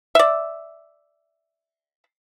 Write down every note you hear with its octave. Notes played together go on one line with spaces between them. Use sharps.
D5 E5